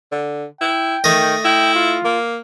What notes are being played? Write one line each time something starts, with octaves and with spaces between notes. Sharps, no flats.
D3
E4 G5
D#3 A3 D#5
E4 G5
F4
A#3